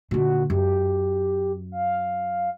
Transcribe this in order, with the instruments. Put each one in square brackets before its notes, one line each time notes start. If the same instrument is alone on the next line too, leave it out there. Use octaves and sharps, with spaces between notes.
[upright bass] A#2 D3 [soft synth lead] F#4
[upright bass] F#2 [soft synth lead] G4
[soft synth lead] F5